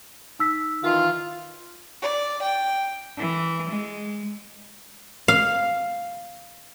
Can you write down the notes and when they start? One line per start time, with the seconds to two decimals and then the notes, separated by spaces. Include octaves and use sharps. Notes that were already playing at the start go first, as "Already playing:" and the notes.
0.39 D#4 E6 B6
0.84 D#3 E3 F4
2.02 D5
2.42 G5
3.18 E3
3.71 G#3
5.28 F5